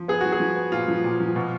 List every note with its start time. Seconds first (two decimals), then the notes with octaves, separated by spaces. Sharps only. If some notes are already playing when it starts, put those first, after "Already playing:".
Already playing: F3
0.08 B3 G#4
0.21 F3 F#4
0.32 G#4
0.40 F3
0.56 B3
0.72 A#2 F4
0.88 F3
1.04 A#2
1.20 F3
1.36 B2